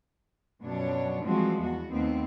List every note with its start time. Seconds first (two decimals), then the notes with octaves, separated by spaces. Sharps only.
0.61 F#2 B2 F3 D4 C#5
1.24 E3 F3 G3 G#3 C4 F#4
1.60 E2 B3 F#4
1.91 D#2 A3 B3 C4